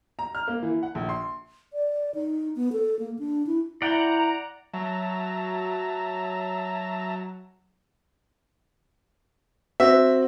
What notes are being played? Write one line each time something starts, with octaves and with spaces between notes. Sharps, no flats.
A#5
F6
A#3
E3
F#5
A#1
C6
D5
D#4
B3
A4
A#3
D4
E4
E4 D5 F#5 G5 A#5
F#3 E5 A5 A#5
C4 F#4 E5